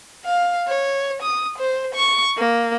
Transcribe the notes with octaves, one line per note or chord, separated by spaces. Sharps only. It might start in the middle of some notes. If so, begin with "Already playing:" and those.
F5
C#5
D#6
C5
C#6
A#3